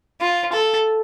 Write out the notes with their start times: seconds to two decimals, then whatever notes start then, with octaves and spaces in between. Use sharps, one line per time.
0.21 F4
0.52 A4